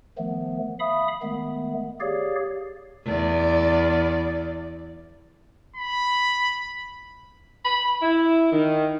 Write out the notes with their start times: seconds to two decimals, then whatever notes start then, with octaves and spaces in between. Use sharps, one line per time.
0.18 D#3 F3 A3 B3
0.80 E5 F5 B5 D#6
1.22 D#3 G#3 A3 B3
2.00 G4 G#4 C#5 D5 F5
3.06 E2 D5
5.76 B5
7.64 B5
8.02 E4
8.52 D#3